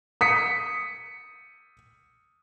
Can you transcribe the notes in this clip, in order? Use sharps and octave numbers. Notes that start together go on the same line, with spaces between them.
D#6 B6 C#7